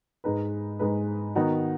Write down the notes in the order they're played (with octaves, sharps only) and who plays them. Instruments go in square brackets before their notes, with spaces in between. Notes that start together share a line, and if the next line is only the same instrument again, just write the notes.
[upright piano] G#2 G#3 D#4 B4
G#2 G#3 D#4 B4
D#3 B3 D#4 F#4